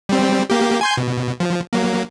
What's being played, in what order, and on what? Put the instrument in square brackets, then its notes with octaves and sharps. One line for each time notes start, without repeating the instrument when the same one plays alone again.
[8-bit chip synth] G3 C4
A#3 G4
G#5 C6 G6
B2
F3
F#3 A#3